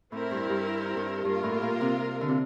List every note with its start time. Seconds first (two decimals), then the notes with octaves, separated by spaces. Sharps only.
0.12 A2 C4 E4 A#4
0.31 G2
0.50 G2
0.97 G2
1.25 G2 A#3 F4 A#4
1.43 A2
1.61 A#2
1.81 C3
2.21 D3
2.28 C3